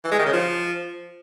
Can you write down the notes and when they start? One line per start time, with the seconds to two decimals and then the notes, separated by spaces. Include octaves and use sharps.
0.04 E3
0.11 G#3
0.19 D#3
0.26 C#3
0.33 F3